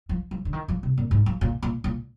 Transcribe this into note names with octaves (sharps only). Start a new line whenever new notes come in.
F3
F3
D3
D#3
F3
C3
A#2
G#2
F3
A#2
A#2
A#2